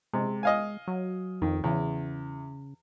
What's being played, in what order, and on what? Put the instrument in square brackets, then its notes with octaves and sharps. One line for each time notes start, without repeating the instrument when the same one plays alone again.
[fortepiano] C3 [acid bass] G#3
[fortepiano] D#5 F5 G#5
[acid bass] F#3
[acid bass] F2 [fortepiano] D#3
[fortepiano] E2 [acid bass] C#3